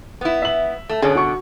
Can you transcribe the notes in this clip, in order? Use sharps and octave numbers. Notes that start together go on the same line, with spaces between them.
B3 E4
E5 F#7
A3
B2 D3 B3 C#4 G#4
F#4 C#6